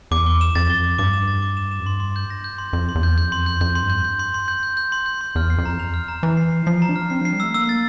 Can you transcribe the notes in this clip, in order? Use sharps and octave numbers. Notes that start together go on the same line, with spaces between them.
E2 D6
G7
E7
F2 A6
G7
D6
G2 D6
E7
A6
D6
E7
E7
F2
G2 C6
C6
G6
A#6
G6
C6
F2 C6
C6
E2
G6
F2 G6
C6
G6
E2
F2 G6
C6
G2
G6
G6
C6
C6
G6
G6
G6
C6
G6
C6
E2 F6
C7
F2
A#5
F7
F6
A#5
E3 A#5
C7
C7
F3 C7
A#5
D4
F6
C4 C7
F3 C7
G3
A3 E6
A#3 E6
A6